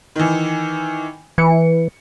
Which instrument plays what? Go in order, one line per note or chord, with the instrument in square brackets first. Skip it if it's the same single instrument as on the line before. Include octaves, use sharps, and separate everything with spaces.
[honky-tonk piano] D#3 E3
[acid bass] E3 [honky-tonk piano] C#7